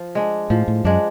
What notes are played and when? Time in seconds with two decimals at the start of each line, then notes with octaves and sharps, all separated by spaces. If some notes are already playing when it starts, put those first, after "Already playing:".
Already playing: F3
0.15 G#3 D4
0.50 A2 F3
0.68 A2
0.84 F#2 G#3 D4